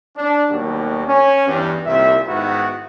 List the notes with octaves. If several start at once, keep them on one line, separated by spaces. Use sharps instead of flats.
D4
D#2 B2 F#3 G3 A#3
C#4
E2 G2
C2 A#2 D#3 E5
G#2 D#3 B3 E4 F#4